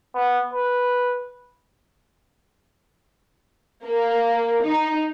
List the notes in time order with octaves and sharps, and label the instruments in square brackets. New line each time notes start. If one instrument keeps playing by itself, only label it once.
[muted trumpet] B3
B4
[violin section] A#3
D#4